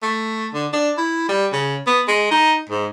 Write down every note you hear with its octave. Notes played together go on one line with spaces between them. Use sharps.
A3
D3
D4
E4
G3
C#3
B3
G#3
D#4
G#2